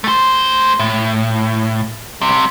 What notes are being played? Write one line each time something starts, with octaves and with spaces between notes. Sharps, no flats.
A3 C5
A2
C2 C3